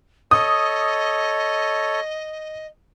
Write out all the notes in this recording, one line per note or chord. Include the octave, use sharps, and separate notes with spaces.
A4 C#5 D#5 D#6